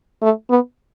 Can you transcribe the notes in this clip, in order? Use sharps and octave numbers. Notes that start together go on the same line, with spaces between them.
A3
B3